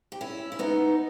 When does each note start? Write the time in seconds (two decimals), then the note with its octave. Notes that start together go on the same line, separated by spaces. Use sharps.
0.12 G4
0.21 C#4 E4
0.52 E4
0.59 B3 D#4